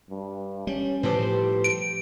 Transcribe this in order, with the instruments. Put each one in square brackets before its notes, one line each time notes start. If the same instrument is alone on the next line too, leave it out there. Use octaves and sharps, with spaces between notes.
[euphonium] G2
[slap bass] G3 [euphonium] C#4
[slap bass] A2 F3 G3 [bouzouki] G4 A4 C5 [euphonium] B4
[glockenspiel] D7